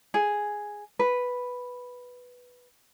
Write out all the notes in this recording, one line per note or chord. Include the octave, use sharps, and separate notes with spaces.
G#4
B4